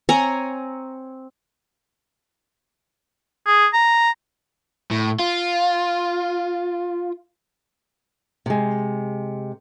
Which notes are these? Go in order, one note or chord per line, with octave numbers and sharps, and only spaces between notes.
C4 C#5 G#5 A#5
G#4
A#5
A2
F4
C3 G#3